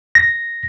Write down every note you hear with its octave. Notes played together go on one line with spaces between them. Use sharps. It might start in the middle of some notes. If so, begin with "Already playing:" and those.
A#6